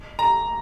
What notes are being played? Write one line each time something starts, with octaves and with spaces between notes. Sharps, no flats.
A#5